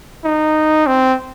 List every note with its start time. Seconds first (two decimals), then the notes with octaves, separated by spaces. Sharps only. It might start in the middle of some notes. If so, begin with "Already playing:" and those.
0.24 D#4
0.87 C4